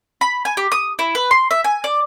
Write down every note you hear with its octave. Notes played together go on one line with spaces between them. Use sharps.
B5
G#5
G4
D#6
E4
B4
C6
E5
G#5
D5